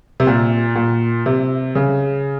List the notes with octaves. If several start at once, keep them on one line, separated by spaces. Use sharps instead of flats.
C3
A#2
A#2
C3
C#3